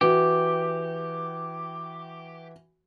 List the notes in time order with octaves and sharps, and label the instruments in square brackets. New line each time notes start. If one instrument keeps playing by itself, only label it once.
[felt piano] E3 F#4 [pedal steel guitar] G4